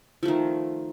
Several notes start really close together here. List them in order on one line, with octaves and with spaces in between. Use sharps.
F3 A3 D#3